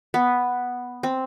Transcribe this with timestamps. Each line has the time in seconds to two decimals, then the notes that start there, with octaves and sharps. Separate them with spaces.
0.14 B3
1.03 C4